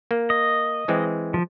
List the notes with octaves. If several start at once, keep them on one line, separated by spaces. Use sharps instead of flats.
A#3
D#5
E3 G#3 C4
F3